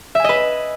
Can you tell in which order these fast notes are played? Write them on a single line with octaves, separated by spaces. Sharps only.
E5 G#5 D#5 B4